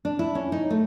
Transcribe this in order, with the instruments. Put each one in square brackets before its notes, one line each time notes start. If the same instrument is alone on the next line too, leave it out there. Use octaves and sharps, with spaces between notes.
[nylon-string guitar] D4
E4
C#4
D#4
A3